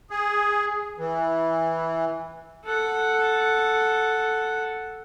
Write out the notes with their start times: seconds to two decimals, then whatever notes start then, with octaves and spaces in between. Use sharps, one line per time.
0.11 G#4
0.98 E3
2.65 A4 F#5